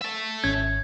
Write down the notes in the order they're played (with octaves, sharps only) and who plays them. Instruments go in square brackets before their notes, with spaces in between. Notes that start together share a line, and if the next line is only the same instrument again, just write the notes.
[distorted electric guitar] E5 A5
[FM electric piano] G#1 C#4 [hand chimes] G#6